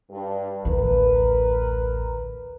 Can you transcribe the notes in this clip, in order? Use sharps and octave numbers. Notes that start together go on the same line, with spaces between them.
G2
A1 D2 A#4 B4